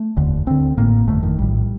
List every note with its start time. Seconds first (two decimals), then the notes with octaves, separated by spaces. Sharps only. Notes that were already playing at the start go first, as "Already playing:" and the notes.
Already playing: A3
0.17 F1 D#2 D3
0.47 D2 D3 C4
0.77 A1 A2 A#3
1.07 G1 F2 D3 A3
1.23 D#3
1.38 A#1 A2 G3